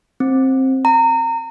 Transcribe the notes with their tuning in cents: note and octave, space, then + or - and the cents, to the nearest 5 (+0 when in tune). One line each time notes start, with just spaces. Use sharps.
C4 +15
A#5 -25